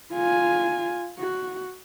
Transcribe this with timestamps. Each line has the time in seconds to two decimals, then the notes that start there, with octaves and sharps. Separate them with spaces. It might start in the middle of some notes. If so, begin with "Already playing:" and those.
0.13 F4 G#5
1.19 F#4